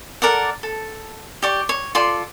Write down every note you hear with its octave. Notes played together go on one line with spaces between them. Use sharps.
A4 A#4 D5 F#5
A4
G4 D5 C#6
C#5
F4 A4 D5 C6